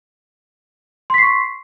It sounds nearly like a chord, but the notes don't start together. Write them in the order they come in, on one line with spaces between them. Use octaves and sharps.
C6 B6 C7 C#6